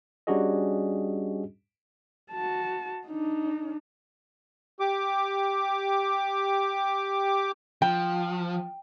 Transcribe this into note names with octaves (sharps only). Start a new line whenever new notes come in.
G3 C#4 D4 F#4 G#4 D#5
F#4 A5
D4 D#4
G4 D6
F3 G5